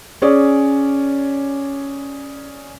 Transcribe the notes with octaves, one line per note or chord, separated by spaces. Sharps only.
C#4 G#4 C#5 D5